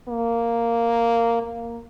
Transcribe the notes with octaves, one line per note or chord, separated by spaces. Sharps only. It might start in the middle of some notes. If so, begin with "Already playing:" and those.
A#3
A#3